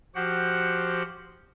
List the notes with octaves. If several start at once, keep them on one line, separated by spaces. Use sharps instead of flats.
F3 F#4 G4 C5 F#5